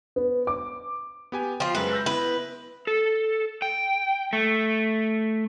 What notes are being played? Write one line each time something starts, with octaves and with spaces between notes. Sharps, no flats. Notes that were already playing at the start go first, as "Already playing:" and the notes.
B3
D6
B3 G4 G#5
F3 F4 G5 C6
F#2 G#3 B4 E5
E6 G6 A#6
B3 E4 B4
A4
G5
A3